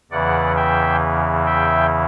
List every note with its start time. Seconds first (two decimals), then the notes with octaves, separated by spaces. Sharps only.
0.11 E2 C#3 E3 D5 F#5
0.56 E5 G5
1.46 E5 G5